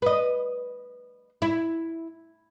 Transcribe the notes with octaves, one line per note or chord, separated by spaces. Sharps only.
B4 D#5
E4